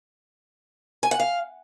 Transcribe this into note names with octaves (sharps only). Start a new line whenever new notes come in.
G#5
F#5
F5